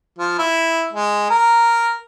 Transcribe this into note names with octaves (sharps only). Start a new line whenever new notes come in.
F3
E4
G#3
A#4